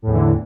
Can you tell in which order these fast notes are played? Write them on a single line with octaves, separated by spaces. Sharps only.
A2 E2 E3 D3